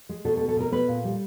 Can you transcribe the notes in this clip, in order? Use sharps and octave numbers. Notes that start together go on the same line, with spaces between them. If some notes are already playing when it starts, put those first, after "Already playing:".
G#3
B2 A4
A4
B3
A4
B2 A#4
B3 B4
A#2
G3